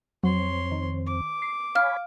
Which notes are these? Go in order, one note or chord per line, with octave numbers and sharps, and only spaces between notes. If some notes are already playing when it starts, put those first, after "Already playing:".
F2 F#3 C4 C#5 C6
D#3
D6
C7
C#5 F5 G#5 B5 F6